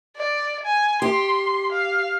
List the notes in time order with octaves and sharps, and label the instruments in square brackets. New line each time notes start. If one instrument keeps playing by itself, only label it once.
[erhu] D5
G#5
[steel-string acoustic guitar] G4 [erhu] C6
[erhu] F5